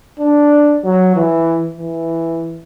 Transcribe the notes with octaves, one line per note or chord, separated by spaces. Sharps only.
D4
F#3
E3
E3